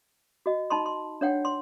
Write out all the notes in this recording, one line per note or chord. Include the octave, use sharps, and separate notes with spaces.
F#4 D#5
D#4 A5 B5 C6
C6
D4 C#5 F#5 G5
C6